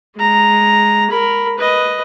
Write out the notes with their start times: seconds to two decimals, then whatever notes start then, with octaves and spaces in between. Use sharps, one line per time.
0.17 G#3 A#5
1.11 A#4 B5
1.59 B4 D#5